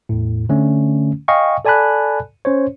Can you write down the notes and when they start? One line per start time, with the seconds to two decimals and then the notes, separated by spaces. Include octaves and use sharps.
0.09 E2 A2
0.49 D3 A3 C#4
1.28 D#5 F5 G5 G#5 C#6
1.65 A4 D5 G#5 A5 B5 F#6
2.45 C#4 C5 C#5